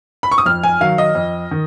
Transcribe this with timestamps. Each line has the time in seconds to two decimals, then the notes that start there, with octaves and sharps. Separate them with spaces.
0.23 B5
0.32 C#6
0.38 D#6
0.46 F2 F6
0.63 G#5
0.81 D#3 F#3 F5
0.98 D#5
1.15 F2
1.51 D#3